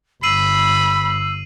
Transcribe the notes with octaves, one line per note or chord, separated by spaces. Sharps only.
G1 B5 E6 C7 D#7 F#7